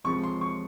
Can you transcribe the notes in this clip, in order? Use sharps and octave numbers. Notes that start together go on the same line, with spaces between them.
C#2 C3 F3 C#6
C6
C#6